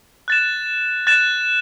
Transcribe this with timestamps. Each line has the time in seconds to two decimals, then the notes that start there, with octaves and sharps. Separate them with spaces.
0.28 F#6 A6 E7
1.07 F#6 A6 E7